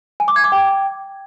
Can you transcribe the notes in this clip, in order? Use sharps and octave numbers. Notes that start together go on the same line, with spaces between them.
G#5
D6
G#6
D6
G5